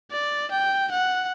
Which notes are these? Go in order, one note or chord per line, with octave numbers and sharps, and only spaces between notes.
D5
G5
F#5